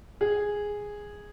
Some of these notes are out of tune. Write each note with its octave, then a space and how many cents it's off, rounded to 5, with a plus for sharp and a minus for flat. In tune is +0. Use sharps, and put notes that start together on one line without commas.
G#4 -5